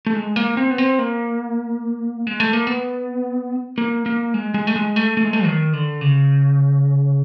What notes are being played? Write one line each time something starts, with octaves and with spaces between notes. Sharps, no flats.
A3
G#3
A#3
C4
B3
C4
A#3
G#3
A3
A#3
B3
A#3
A#3
G#3
G#3
A3
G#3
A3
A3
G#3
A3
D#3
D3
C#3